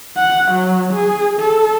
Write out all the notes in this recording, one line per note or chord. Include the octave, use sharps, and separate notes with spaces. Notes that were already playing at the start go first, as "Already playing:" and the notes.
F#5
F#3
G#4
A4